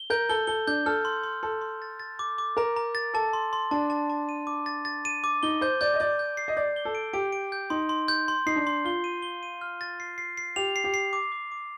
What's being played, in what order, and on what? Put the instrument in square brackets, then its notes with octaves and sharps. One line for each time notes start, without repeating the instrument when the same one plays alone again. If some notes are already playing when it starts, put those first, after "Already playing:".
Already playing: [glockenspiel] G7
[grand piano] A#4 [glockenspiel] G6
[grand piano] A4 [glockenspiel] G7
[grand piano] A4 [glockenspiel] G7
[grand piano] D4 [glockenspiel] G6
[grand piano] A4 [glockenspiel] F6
[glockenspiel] C6
C6
[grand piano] A4 [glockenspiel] C6
[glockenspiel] C6
A6
A6
D6
D6
[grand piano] A#4 [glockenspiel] A#5
[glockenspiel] A#5
A6
[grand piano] A4 [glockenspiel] A5
[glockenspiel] C6
C6
[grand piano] D4 [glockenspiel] A5
[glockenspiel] A5
A5
D#7
D6
A6
A6
D#7
D6
[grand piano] D#4 [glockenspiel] G7
[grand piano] C5 [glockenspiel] G6
[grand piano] D5 [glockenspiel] G6
[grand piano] D#5
[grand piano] D5 [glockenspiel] G6
[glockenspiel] G6
C7
[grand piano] D#5
[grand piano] D5 [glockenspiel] G6
[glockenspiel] G7
[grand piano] A4
[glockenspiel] D7
[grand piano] G4 [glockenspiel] D7
[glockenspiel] D7
G6
[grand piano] D#4 [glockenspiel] C6
[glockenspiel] C6
G6
C6
[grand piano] D#4 [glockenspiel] C7
[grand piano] D4
[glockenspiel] C6
[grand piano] F4 [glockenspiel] G7
[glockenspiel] D#7
G7
D#7
F6
A6
C7
C7
C7
[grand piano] G4 [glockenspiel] F7
[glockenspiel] C7
[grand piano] G4
[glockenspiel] C7
D6
D6
D6